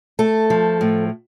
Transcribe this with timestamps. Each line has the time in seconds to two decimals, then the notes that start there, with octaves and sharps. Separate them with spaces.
0.19 A3 A4
0.50 F3
0.81 A2